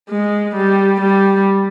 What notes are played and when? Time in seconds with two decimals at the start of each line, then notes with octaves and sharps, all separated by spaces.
0.10 G#3
0.56 G3
1.01 G3